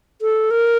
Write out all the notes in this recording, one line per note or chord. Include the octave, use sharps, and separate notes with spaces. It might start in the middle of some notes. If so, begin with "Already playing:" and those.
A4
A#4